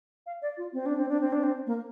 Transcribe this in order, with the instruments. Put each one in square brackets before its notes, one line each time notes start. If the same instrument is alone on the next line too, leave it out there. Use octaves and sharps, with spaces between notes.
[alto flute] F5
D5
F4
C4
D4
C4
D4
C4
D4
C4
A#3